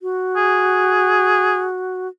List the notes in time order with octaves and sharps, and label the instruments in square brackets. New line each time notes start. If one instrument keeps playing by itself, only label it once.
[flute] F#4
[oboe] G#4